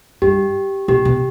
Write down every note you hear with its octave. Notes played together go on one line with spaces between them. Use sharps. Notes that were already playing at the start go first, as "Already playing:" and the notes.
G2 G4
B2 G4
B2